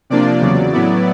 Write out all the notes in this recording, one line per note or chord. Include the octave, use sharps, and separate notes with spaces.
C3 F3 A#3 D4 F4 D5
E2 C#3 F#3
A2 F#3 B3 E4